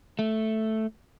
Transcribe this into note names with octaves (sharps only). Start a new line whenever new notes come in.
A3